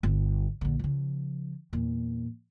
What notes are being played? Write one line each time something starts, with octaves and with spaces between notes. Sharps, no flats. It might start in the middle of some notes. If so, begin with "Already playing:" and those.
G1
A#1 D3
C#3 F3
E2 A#2